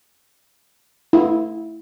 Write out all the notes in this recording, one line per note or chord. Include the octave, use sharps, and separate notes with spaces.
E4